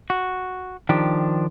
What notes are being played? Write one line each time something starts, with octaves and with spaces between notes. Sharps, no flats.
F#4
D#3 F3 D4 G4